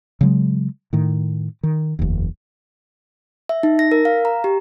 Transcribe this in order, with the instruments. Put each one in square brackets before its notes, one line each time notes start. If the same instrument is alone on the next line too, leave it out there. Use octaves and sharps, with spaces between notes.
[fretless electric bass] C#3 F#3 G#3
A2 D#3
D#3
F1 D#2
[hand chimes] E5
D#4
A#6
A#4
F5
A#5
G4